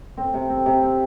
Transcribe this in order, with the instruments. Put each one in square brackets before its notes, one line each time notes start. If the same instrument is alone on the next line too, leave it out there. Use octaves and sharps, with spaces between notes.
[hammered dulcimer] C4
C3
C4
C3
C4